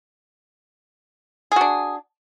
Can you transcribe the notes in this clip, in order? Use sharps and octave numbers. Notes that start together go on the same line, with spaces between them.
D4 F#4 G#4